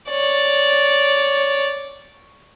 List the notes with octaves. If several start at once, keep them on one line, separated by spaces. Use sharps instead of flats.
C#5 D5